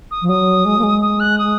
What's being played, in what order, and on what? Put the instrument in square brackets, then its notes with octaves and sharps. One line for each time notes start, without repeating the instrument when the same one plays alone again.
[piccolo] D#6
[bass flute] F3
[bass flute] F#3 [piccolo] D#6
[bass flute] G#3
A#3
G#3
[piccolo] D#6
F#6
D#6